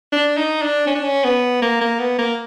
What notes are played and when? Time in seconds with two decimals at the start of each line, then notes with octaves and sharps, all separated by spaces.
0.12 D4
0.37 D#4
0.62 D4
0.87 C#4
0.95 D4
1.04 C#4
1.24 B3
1.62 A#3
1.81 A#3
1.99 B3
2.19 A#3